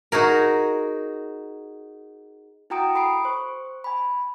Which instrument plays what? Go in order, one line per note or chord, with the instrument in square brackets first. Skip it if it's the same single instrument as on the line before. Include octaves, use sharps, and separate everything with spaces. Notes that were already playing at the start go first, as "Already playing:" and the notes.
[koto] D#4 F#4 G#4 A#4
[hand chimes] E4 F#4 G5 A#5 D#6 D7
A4 B5 D#6 C7 D7
C5 C#6
G#5 B5